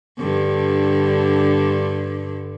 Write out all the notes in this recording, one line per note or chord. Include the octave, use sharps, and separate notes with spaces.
G2 D3